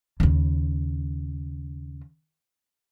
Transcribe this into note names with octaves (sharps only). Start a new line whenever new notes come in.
D#2 C#3